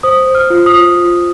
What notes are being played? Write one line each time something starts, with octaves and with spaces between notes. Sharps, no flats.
C5 D#6
C5
F6
F4
D#6
F4
F4